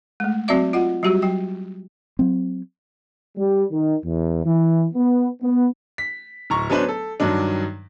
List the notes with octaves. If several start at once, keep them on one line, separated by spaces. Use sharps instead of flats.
G#3 A3
F#3 C4 F#4 D5 E5 D6
F4 D#5 F#5
F#3 G3 F#4 G4
F#3 G5
F#3 C4
G3
D#3
E2
E3
B3
B3
B6
D1 A#5 C#6
F#3 B3 C#4 D4 B4 C5
A4
G2 D#3 F#3 D4